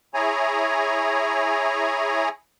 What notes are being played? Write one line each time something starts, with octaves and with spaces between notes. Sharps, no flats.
E4 G#4 C#5 G#5 A#5